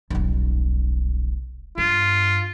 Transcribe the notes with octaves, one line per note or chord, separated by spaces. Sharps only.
D#1 B1
G2 F4